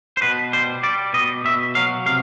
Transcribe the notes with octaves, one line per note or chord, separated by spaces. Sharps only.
C5
B2 B4
G3 C5
G3 D5
B2 D#5
B2 E5
F#3 F5
C3 F5